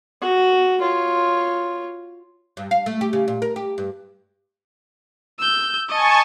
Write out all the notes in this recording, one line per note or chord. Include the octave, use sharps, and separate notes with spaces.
F#4
F4 C#5
G2
F5
A3
G4
C#3
A#2
A#4
G4
G2
E6 G6
D#5 G#5 A5 C#6